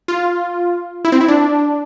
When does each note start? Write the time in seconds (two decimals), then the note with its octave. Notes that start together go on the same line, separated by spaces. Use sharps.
0.08 F4
1.05 E4
1.12 C4
1.21 E4
1.28 D4